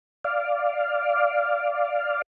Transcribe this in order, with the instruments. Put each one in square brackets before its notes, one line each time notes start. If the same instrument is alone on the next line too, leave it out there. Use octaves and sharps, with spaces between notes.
[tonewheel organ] D5 F5